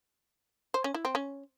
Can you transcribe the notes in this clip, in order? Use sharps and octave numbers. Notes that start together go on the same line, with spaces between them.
C5
C#4
E4
C4
C#4